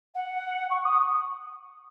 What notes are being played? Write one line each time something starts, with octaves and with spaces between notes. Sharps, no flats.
F#5
C#6
D#6